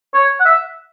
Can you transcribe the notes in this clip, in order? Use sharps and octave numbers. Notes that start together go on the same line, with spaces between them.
C#5
F#5
E5